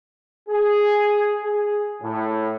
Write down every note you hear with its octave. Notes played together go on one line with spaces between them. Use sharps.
G#4
G#4
A2